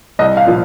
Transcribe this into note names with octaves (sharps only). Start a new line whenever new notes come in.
C2 D#5
F5
A#2 F3